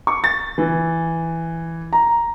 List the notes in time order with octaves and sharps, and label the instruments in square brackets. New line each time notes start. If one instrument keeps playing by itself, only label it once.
[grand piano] C#6
A6
E3
A#5